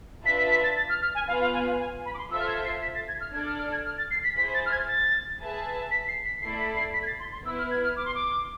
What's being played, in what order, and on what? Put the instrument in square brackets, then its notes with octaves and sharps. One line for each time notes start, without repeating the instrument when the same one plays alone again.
[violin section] D4 F4 B4 E5 A5 [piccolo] B6
[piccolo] B6
B6
A6
A6
F6
F6
G#5
[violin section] B3 F4 B4 [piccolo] F5
[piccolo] F5
G#5
F5
G#5
B5
D6
C6
[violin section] F4 A4 C5 E5 [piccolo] E6
[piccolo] F6
G#6
C7
B6
A6
G#6
F6
[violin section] D4 A4 D5 [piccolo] G#6
[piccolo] F6
F6
G#6
F6
A6
C7
B6
[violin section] E4 G#4 C5 [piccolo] B6
[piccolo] A6
F6
G#6
A6
[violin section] G#4 B4 E5 A5
[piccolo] B6
C7
B6
[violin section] A3 E4 A4 D5 [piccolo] C7
[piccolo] B6
C7
B6
G#6
A6
C6
C6
[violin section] B3 E4 B4 [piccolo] E6
[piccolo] F6
G#6
F6
D6
C6
D6